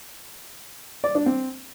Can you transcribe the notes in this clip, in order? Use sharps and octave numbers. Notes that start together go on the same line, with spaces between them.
D5
D4
C4